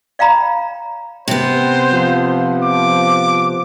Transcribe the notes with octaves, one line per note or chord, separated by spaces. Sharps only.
D5 F5 G5 A#5 B5
C3 B3 C5
F3
D6